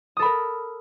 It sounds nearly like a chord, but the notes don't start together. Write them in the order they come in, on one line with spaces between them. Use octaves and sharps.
D#6 A4 B5 A#4